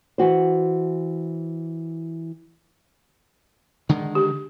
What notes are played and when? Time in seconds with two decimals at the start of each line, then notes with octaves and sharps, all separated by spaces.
0.18 E3 F#4 C5
3.89 D3 D#3 G#3
4.15 G4